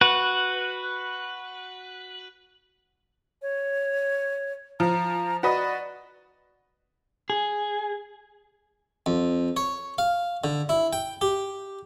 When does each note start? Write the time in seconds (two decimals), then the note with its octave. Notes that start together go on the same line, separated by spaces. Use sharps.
0.01 F#4 B4
3.42 C#5
4.80 F3 A#5
5.43 F#4 B4 D5 D#5
7.30 G#4
9.06 F2
9.57 C#5
9.98 F5
10.44 D3
10.69 E4
10.93 G5
11.21 G4